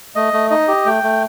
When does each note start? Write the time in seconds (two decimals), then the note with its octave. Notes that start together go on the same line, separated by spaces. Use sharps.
0.15 A3 D#5
0.33 A3
0.51 D#4 D#5
0.68 G4
0.85 A3 G5
1.03 A3